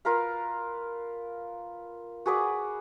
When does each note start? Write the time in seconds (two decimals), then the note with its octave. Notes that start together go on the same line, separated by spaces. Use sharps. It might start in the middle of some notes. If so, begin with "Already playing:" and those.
0.05 F4 A#4 B4 F5
2.26 F#4 G#4 B4 D5